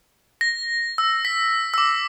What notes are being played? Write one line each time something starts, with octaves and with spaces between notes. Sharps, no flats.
A#6
E6
B6
D6 E6